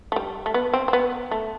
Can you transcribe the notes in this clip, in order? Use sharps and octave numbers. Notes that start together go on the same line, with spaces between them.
A3
G3
A3
B3
C4
C4
B3
A3